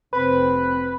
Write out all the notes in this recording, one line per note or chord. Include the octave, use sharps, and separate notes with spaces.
F1 C4 B4